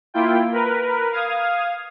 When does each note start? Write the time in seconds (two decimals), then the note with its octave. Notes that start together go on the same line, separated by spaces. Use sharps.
0.14 A#3 E4 F4 G5
0.52 A#4 B4
1.12 F5 D#6 G#6